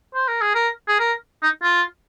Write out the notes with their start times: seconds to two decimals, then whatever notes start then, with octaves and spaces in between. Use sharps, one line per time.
0.15 C5
0.28 A#4
0.42 G#4
0.55 A#4
0.88 G#4
1.00 A#4
1.43 D#4
1.63 F4